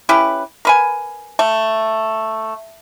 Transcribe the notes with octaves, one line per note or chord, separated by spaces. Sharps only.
C#4 E4 G4 B4
A#4 B4 G#5
A3